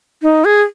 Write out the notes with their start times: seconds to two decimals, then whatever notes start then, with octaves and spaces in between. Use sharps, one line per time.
0.23 D#4
0.45 G#4